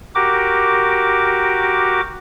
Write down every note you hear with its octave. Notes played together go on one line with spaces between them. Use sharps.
F#4 G4 A#4 D6